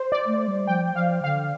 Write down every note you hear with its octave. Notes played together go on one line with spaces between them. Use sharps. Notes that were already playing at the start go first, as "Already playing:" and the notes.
Already playing: C5
D5
A3
G3
F3 G5
F3 F5
D3 F5